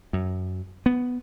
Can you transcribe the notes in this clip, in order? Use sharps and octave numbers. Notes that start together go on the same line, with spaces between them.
F#2
B3